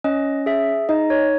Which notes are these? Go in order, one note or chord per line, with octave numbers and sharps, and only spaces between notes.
C#4 D#5
G#4 E5
D#4 D#5
C#5